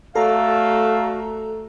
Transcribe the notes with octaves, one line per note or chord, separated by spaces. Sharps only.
A3 F#4 A4 D5 E5 F5 A#5